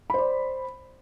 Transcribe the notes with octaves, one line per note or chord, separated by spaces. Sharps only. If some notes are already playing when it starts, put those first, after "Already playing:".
C5 D5 B5